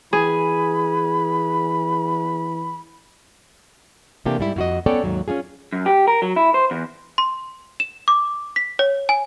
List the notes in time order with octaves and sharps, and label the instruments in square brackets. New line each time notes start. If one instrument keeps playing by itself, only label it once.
[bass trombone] E3 [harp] G#4 [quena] B5
[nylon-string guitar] C3 E3 A3 A#3 D4 G4
G#2 G3 E4
F2 F#4 D#5
B3 C#4 A4 C#5 D5 G5
D#2 G#2 F#3
C#4 D4 F4 G#4
[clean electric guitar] F#2
G4
A#4
F#3
E4
C5
E2
[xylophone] C6
E7
D6
B6
C#5
G#5